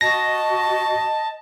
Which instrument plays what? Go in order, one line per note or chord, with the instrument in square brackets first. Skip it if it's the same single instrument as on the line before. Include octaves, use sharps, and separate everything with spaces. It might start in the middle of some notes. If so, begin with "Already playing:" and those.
[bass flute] F#4 [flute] D#5 [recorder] A5 [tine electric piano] A#6